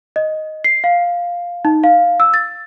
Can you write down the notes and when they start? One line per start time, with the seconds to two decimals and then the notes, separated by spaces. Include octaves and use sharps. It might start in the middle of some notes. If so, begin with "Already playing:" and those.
0.16 D#5
0.64 C7
0.84 F5
1.65 D#4
1.84 F5
2.20 E6
2.34 A6